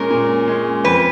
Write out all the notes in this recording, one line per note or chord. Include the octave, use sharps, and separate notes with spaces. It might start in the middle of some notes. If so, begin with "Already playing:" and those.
Already playing: A#2 G#3 C#4 A#4
A#2
G#3 C#4
F2 B4